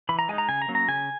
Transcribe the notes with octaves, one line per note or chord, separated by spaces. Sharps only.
E3 B5
A#5
G#3 D#4 G#5
A#5
C#3 G#5
A#5
F#3 A#3 C#4
A#5
C#3 G#5